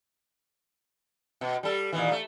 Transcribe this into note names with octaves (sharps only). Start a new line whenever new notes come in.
B2
G3 A4
A#2 D#3 E3
A3